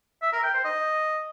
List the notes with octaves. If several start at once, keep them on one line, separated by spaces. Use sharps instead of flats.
E5
A#4
G5
C5
D#5